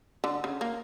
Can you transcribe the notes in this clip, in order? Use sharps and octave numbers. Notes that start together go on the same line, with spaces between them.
D3
C#3
A#3